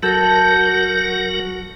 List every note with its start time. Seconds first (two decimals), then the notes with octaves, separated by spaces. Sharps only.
0.03 F#3 F#4 A4 A#4 G6